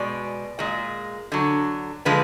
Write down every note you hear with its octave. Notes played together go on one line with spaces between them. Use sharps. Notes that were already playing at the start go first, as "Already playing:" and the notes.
Already playing: B2 G#3 D5
A#2 G#3
D3 F#3
D3 F3 G#3 B4